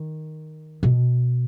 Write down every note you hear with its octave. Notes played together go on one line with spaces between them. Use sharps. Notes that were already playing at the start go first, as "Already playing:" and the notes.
Already playing: D#3
B2